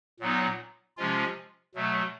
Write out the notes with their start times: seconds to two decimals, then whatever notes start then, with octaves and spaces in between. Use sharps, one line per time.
0.20 A#2 F#3 B3 D#4
0.97 C3 F3 G#3 C#4 F4
1.75 B2 F#3 A3